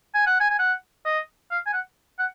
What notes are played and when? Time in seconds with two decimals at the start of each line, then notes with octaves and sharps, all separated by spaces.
0.14 G#5
0.26 F#5
0.40 G#5
0.51 G#5
0.59 F#5
1.05 D#5
1.51 F5
1.67 G#5
1.73 F#5
2.19 F#5